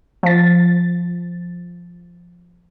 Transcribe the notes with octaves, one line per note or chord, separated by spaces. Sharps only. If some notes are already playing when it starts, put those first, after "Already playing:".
F3 A6